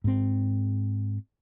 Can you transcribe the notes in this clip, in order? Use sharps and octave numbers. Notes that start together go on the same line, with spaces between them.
G#2 C4